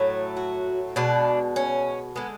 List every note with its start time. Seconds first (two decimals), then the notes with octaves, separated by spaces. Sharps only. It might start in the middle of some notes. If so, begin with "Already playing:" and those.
Already playing: A2 F#3 A3
0.36 F#4
0.96 B2 G#3 D4
1.56 C#4
2.16 D3 G#3 B3